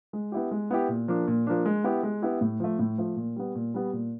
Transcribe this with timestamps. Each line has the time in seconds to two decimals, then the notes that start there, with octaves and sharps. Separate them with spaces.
0.13 G#3
0.32 B3 E4 G4
0.51 G#3
0.71 B3 E4 G4
0.89 A#2
1.08 F3 A#3 D4
1.28 A#2
1.47 F3 A#3 D4
1.66 G#3
1.84 B3 E4 G4
2.03 G#3
2.22 B3 E4 G4
2.41 A2
2.60 F3 A3
2.79 A2
2.98 F3 A3
3.16 A#2
3.36 G3 B3
3.55 A#2
3.74 G3 B3
3.93 A#2